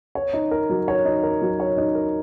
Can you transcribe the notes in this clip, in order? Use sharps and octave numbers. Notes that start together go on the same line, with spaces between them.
C#5
D#4
A#4
F#3
C#5
D#4
A#4
F#3
C#5
D#4
A#4